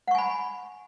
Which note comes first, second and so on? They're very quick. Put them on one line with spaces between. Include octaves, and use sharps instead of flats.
F#5 C#6 G#5 B5